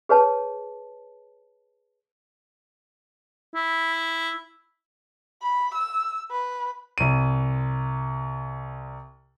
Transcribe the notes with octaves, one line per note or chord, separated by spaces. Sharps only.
G#4 B4 C#5 A5
E4
B5
E6
B4
C2 D#7